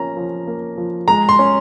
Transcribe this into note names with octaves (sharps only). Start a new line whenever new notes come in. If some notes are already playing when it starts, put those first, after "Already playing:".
Already playing: F3 A#3 C#4 A#5
F3
A#3
F3
G#3 A#5
C6
C#4